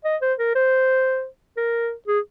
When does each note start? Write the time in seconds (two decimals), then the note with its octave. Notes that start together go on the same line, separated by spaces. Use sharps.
0.05 D#5
0.22 C5
0.39 A#4
0.55 C5
1.57 A#4
2.08 G#4